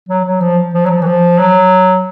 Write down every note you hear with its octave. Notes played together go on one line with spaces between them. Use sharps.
F#3
F#3
F3
F3
F#3
F3
E3
F3
F#3